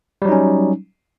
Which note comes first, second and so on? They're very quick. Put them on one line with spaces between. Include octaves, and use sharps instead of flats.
G3 F#3 D#4 C#4